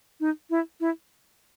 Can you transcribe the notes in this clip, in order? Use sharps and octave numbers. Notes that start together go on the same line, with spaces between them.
D#4
E4
E4